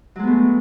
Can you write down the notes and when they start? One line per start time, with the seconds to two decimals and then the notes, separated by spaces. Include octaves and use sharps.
0.16 F#3
0.19 G#3
0.23 B3
0.27 A3